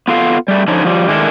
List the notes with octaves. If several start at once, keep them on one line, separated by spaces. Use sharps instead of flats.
B3 F4 A4 F5
G3 A3
D3 F3 C#4 D#4
F3 G3
D#3 G#3 D4 E4 A4 A#4